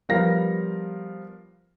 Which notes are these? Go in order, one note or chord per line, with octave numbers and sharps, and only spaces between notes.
F3 G3 B3 A#4 F5 A#6